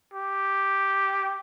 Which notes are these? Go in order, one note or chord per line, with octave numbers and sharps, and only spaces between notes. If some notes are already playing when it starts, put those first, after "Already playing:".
G4